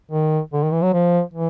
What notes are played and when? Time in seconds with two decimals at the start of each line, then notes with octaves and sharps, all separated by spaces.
0.12 D#3
0.53 D3
0.63 D#3
0.72 E3
0.82 F#3
0.93 F3
1.34 E3